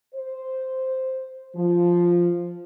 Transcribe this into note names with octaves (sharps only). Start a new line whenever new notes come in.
C5
F3